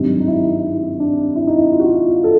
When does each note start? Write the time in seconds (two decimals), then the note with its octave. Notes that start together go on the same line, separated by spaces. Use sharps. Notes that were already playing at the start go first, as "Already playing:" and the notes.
Already playing: G#1 G2 D#3 F#3
0.19 D#4
0.28 E4
0.64 D#4
1.00 D4
1.36 E4
1.47 D#4
1.58 E4
1.72 F4
1.79 F#4
1.86 F4
2.09 F4
2.24 A4